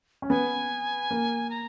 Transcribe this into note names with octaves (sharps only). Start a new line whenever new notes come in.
C#4
B3 G#5
A#3
A#5